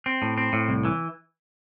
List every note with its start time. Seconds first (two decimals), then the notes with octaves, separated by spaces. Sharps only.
0.06 C4
0.22 A2
0.38 C4
0.53 A2
0.69 C2
0.85 E3